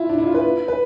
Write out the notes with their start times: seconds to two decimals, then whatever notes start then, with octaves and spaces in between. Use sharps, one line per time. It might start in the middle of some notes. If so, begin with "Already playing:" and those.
Already playing: E4 F4
0.09 D4
0.18 E4
0.27 F4
0.34 B4
0.68 B4